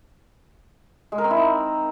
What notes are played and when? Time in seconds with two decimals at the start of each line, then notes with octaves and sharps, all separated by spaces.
1.12 G#3
1.18 A#4
1.24 C4
1.30 E4
1.37 D#4